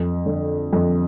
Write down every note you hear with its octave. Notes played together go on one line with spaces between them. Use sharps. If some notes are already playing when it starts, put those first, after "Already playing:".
Already playing: F2
D3
F2